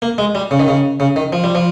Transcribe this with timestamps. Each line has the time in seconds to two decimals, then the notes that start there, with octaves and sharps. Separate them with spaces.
0.02 A#3
0.18 G#3
0.35 G3
0.51 C#3
0.59 D#3
0.68 C#3
1.00 C#3
1.16 D#3
1.33 F3
1.44 G3
1.55 F3